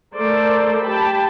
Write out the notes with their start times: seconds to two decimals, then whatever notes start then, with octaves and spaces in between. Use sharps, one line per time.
0.15 A3 A4 A#4 C5 D5
0.83 G4 G5 A5 B5